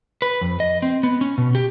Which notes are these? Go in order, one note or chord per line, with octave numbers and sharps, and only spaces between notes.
B4
F2
D#5
C4
B3
C#4
B2
G4